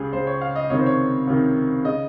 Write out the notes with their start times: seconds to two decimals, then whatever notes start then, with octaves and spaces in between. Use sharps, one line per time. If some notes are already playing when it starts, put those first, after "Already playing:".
Already playing: C#2 C#3 G4 G#4
0.13 C#2 C#3 C5
0.27 C#5
0.41 F5
0.56 D#5
0.70 C#2 C3 D#3 C#5
0.79 C5
0.86 C#5
1.27 C#2 C3 D#3
1.84 C#3 D#5